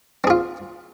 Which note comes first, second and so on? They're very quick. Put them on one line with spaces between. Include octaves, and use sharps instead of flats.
C4 G#4 F4